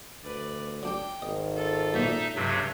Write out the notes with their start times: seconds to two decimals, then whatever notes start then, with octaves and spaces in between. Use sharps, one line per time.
0.24 D2 B4 D5
0.83 F#3 D4 G4 G5
1.22 G#1 D#5
1.56 F4 A4
1.94 F#2 A#2 D#4 E5
2.35 C#2 G2 C3 F#3 E5